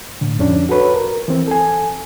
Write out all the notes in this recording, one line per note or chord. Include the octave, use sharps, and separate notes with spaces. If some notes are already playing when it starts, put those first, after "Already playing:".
A2 D3
F2 C#4 D4
F#4 A4 B4 C#5
A#4
E3 C4
A4 G#5